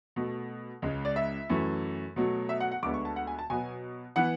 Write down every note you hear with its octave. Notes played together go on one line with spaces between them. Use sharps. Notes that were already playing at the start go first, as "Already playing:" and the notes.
B2 A3
C#2 C#3 G#3
D5
E5
F#2 E3 A3
B2 F#3 A3
E5
F#5
F#5
D2 D3 G#3 B3 D6
C#6
A5
F#5
G#5
A5
B2 F#3 B3 G#5
E3 B3 F#5